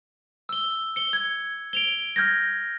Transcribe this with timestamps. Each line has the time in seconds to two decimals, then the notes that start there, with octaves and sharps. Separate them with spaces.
0.49 E6 G7
0.96 C#7 G7
1.13 G#6
1.73 D7 F7 G7
2.16 F6 G6 G#6 A#6